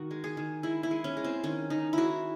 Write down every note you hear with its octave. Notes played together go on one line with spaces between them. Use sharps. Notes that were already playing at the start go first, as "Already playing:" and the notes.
Already playing: D#3 F#4
G#3
G#4
D#3
G#3 E4
E4
G#3
C#4
G#3
C4
D#3 C#4
D#3 D#4
G#3 E4 F#4